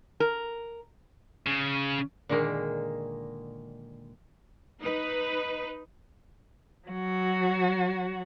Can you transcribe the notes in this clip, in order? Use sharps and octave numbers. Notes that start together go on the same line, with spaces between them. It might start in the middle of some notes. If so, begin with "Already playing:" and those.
A#4
C#3
A#2 D3 D#3 G#3 A#3
D#4 B4
F#3 F#4